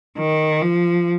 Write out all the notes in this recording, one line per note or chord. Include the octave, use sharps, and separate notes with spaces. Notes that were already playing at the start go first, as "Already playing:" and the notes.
D#3
F3